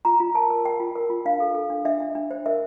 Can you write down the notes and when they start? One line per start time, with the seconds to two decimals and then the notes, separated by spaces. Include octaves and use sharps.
0.05 F4 A#5
0.20 F4
0.35 A#4 A5
0.50 A#4
0.65 A#4 G5
0.80 F4
0.95 A#4
1.10 F4
1.25 D4 F5
1.40 A4
1.55 A4
1.70 D4
1.85 D4 E5
2.01 D4
2.15 D4
2.31 C5
2.46 A#4 E5